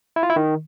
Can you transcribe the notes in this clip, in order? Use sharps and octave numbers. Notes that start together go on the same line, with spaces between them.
E4
F4
E4
D#3